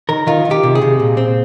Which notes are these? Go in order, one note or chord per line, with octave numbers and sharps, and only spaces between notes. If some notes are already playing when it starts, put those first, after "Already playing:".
D#3 A#4
D#3 F4
D#3
G4
C3
G#4
C3
A#2
C4